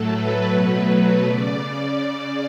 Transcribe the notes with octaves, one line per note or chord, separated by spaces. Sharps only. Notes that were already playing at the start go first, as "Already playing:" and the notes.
Already playing: A2 F#3 A3 A4
B4
B2 F#3 A3
C#3 D5